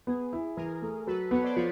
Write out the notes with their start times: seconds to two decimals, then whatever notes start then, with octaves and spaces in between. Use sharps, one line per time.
0.07 B3 G#4
0.33 E4
0.57 E3 G#4 A#4
0.82 A3
1.07 F#3 A4 B4
1.31 B3 B4 C#5
1.44 C5 D5
1.56 F3 B4 C#5